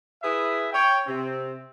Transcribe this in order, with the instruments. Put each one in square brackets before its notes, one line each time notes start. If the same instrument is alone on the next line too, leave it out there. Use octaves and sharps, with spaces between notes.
[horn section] E4 G#4 B4 E5
C#5 G5
C3 C4